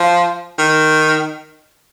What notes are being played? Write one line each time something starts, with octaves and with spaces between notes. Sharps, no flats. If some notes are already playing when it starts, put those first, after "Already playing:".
Already playing: F3
D#3